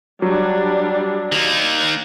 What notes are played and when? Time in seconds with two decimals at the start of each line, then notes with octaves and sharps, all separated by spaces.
0.22 F#3 G3 D4
1.32 D#3 A#3